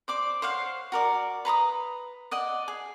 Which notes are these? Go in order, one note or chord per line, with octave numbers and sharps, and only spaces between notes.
C5 D5 D6
C5 C#5 F5 F#5
F#4 A#4 D5
B4 A#5 C6 D#6
D5 D#5 F#5
G#4